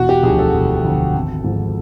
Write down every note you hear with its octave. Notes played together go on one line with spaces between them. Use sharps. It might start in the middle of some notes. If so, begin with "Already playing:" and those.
Already playing: E1 F#4
G4
D2 D3 F3 G#4
A4
E1
D2 D3 F3
G#1
G#2 F3